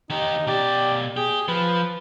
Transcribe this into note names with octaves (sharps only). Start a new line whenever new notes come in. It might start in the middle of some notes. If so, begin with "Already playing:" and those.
D#3 D#4 G4
B2 G4 D5
G4 G#4
F3 B4